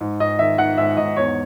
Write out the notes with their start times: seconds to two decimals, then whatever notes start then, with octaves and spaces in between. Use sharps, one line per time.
0.01 G#2
0.20 G#2 D#5
0.39 D#3 E5
0.58 D#3 F#5
0.78 G#2 E5
0.97 G#2 D#5
1.17 E2 C#5